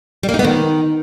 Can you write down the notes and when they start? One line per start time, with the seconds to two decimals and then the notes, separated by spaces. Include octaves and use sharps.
0.23 G3
0.29 A#3
0.34 D#4
0.39 B3
0.44 D#3